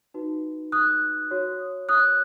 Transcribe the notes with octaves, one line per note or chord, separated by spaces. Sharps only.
D#4 F#4 B4
D#6 F#6
F#4 C#5
D#6 F#6